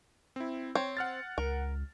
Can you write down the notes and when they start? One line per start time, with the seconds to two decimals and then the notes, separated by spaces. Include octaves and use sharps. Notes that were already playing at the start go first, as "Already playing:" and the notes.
0.36 C4 E4
0.75 C4 C#5
0.97 F#5 F6 A6
1.38 C#2 A#4